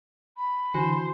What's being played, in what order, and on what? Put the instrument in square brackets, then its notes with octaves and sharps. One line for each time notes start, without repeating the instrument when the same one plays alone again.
[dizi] B5
[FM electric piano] D3 E3 [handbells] E4 F#4 G#5 [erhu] C5